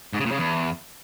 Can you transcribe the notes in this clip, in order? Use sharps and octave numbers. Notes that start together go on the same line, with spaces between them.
G#2
C#3
A#2
C#3
E2